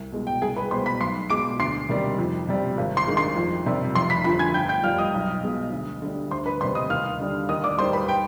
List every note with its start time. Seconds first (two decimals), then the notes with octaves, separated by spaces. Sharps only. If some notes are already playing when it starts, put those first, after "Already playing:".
Already playing: C2
0.12 B2 G#3
0.27 G5
0.42 C2 G#4 G#5
0.56 B4 B5
0.71 B2 G#3 C5 C6
0.86 B5 B6
1.01 B1 C6 C7
1.30 B2 G#3 D6 D7
1.60 D2 C6 C7
1.89 C3 D#3 G3
2.19 F2
2.48 C3 G3
2.77 G#1
2.97 C6 C7
3.07 G2 D#3 G#3
3.17 C6 C7
3.36 F2
3.66 C3 D#3 G3
3.95 F1 C6 C7
4.10 B5 B6
4.24 F2 D3 F3 B5 B6
4.39 G#5 G#6
4.54 G1 G5 G6
4.69 G5 G6
4.84 F2 D#3 G3 F5 F6
4.98 D#5 D#6
5.14 B1
5.43 B2 G#3
5.72 D2
6.02 D3 G3
6.31 D2 C5 C6
6.46 B4 B5
6.61 C3 D#3 G3 C5 C6
6.75 D#5 D#6
6.90 D#2 F5 F6
7.20 D3 G3
7.49 D#2 D#5 D#6
7.64 D5 D6
7.78 D#3 G3 C5 C6
7.93 B4 B5
8.08 G5